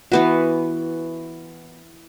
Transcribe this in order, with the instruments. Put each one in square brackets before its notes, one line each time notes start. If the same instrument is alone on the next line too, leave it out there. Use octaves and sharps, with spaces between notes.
[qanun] E3 B3 F#4